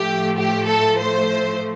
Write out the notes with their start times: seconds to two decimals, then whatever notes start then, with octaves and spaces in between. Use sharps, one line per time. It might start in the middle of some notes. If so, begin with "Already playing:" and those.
Already playing: A2 F3 A3 G4
0.37 G4
0.68 A4
1.00 C5